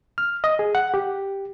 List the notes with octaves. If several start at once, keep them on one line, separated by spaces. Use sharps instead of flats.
F6
D#5
G#4
F#5
G4